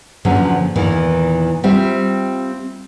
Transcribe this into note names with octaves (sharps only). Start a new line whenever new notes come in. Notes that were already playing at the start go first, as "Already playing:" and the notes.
E2 A#2 D3 F3 F#3 C#4
E2 A#2 D#3 E3
G3 C4 F4 E5